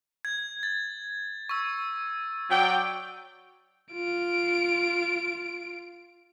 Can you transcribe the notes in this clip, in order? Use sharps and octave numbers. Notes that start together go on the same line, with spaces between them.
G#6
A6
C#6 E6
F#3 D5 G5
F4 D7